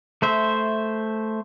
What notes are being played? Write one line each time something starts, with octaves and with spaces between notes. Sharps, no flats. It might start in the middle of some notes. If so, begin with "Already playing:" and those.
A3 C5 E5